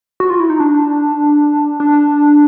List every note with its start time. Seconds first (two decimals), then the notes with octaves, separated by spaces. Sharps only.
0.20 F#4
0.30 F4
0.40 E4
0.50 D#4
0.60 D4
1.80 D4